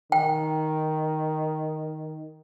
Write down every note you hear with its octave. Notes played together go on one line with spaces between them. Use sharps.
D#3 G5